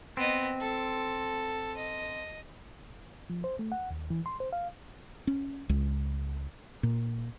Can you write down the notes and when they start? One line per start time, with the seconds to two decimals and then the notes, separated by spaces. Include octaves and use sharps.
0.17 B3 C4 D#5
0.61 A4
1.76 D#5
3.30 F3
3.44 C5
3.59 A3
3.72 F#5
3.91 D#2
4.10 E3
4.26 C6
4.40 C5
4.53 F5
5.27 C#4
5.69 C#2
6.83 A#2